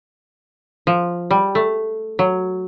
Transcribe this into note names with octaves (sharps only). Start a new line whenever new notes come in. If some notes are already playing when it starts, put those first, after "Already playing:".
F3
G3
A3
F#3